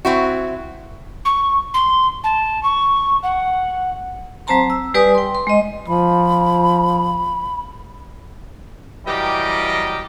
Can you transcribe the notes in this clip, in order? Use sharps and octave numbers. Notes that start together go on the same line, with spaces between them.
C4 E4 F#4
C#6
C6
A5
C#6
F#5
F#3 C4 C5 A5 A#5 C6
E6
G3 G4 B4 D5 G#5 D#6
G5 C6
C6
G#3 D#5
F3 B5
E3 F#3 G3 G4 A#4 D#5